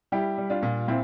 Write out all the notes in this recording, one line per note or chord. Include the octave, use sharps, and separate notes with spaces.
G3 E4 G4
G3
D4 F4
A#2
A#2 C4 E4